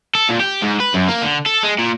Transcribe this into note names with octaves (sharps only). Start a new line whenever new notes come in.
A4
A#2
G4
G#2
B4
F#2
A#3
D3
A4
G#3
A#2